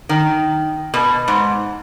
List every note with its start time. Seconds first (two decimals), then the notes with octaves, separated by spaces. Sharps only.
0.09 D#3
0.94 B2
1.28 G#2